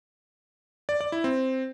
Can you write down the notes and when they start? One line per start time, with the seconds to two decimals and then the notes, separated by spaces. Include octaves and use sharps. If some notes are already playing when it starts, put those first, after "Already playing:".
0.89 D5
1.01 D5
1.12 E4
1.24 C4